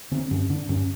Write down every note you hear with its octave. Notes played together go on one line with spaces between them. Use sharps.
D3 C4
G2 C#4
D3 D4
G2 C#4